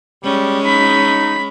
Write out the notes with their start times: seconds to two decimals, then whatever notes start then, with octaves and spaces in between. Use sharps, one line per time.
0.24 G3 G#3 C#4
0.66 D#4 B5 B6